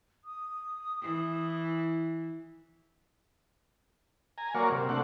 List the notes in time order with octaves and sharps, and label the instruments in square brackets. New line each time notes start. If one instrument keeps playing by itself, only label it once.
[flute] D#6
[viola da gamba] E3
[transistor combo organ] G#5 A#5
F#3 A#3 A#4 C#5 D5 F5
C3
A3 C4 D4 F#5